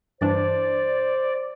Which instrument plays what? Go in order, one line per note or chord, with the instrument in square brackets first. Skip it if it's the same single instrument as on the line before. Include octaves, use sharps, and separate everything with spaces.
[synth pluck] G2 E3 D4 [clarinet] C5 [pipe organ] D5